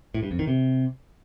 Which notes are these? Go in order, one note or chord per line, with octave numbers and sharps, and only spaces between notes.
A2
G2
F2
D#3
C3